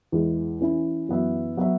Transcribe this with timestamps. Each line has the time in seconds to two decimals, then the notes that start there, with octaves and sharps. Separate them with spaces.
0.12 E2 E3 G#3 E4
0.61 E3 C#4 E4
1.09 F#2 E3 B3 F#4 E5
1.57 F#3 B3 F#4 E5